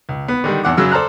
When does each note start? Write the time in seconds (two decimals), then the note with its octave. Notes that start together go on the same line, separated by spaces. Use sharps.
0.09 C#2
0.28 B3
0.44 D3 D#3 G3
0.63 G#1 E2 F#5 D6
0.77 F#2 C#3 F#3 E6
0.91 A4 C5 D5 A#5 F6 F#6